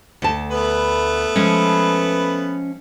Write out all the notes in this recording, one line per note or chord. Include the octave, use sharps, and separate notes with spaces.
D2 A5
A3 B3 B4
F3 G#3 C#4